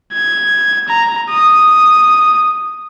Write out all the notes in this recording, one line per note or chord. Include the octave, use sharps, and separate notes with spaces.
G#6
A#5
D#6